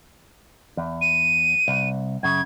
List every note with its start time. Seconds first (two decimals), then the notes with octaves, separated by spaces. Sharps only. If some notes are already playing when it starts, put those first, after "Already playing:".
0.77 E2
1.01 D#7
1.68 C2
2.23 F#2 C#3 G#6